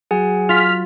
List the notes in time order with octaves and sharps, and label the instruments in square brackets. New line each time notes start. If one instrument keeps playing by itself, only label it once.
[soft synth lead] F#3 [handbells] G#4 F#5 G#5
[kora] F4 [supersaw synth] F6 B6